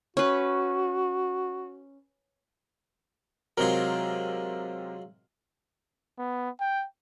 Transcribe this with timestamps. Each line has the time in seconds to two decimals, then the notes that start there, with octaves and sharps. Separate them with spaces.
0.17 C#4 F#4 B4
3.57 C3 F#3 G#3 C4 F4 A#4
6.19 B3
6.60 G5